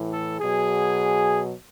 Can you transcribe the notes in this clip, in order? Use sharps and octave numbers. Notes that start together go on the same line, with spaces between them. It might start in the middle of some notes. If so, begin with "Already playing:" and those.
Already playing: A2 E3
A4
B2 F#3 G#4